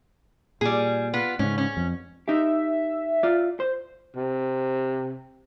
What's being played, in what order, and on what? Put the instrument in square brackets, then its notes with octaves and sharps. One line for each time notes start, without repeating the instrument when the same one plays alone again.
[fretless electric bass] A#2 [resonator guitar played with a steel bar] G3 G#4
[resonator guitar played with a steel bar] B3 F4
[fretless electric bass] G#2 C#3 [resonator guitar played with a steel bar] C#4
[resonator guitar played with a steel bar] C#4
[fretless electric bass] F2
[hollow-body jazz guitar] D#4 G4 [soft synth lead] E5
[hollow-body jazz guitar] F4 D5
C5
[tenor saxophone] C3